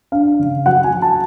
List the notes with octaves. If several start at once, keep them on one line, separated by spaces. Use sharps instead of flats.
D4 F5
C#3
F#3 F#5
G#5
F#3
A5